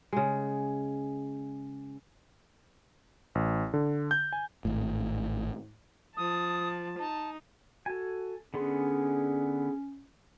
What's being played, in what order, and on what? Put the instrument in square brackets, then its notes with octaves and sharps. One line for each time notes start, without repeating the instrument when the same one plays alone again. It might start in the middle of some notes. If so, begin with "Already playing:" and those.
[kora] C#3 G#3
[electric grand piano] A1
D3
G6
G#5
[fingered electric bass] G#1 A2
[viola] F3 A5 [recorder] D#6
[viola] D#4 [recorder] A5
[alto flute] F#4 [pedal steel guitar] A4 G#5
[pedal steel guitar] D3 B3 C6 [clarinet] C#4 [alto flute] G#4